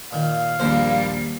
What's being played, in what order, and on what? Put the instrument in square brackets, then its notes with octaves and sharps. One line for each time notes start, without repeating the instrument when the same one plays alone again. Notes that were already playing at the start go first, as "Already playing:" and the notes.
[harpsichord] A#2 D#3 [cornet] F5
[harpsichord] A#1 D#2 C5 [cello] G3 A#3